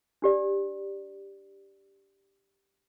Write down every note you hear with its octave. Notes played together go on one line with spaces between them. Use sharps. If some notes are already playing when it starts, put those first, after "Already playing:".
D4 G4 D5